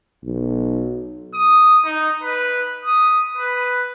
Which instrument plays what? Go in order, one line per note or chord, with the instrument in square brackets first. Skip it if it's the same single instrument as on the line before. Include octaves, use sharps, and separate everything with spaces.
[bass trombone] B1
[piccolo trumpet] D#6
D#4
B4
D#6
B4